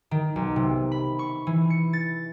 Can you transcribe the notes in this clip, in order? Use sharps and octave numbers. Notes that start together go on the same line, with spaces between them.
D#3
B1
C3
B5
C#6
E3
C#7
A6